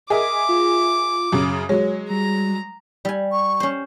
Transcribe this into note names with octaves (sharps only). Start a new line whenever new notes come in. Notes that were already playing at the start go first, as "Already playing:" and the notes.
G#4 A#4 D#5 E5 D6
F4
F#2 C#3
F#3 G#3 C#5
G3 A#5
G3 G#5
C#6
C#4 C5